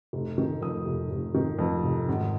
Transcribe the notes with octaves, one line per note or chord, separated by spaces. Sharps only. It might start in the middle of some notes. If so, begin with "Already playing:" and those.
F1
D#3
F2 D#6
F1
F1
D#3
F2
F1
G#1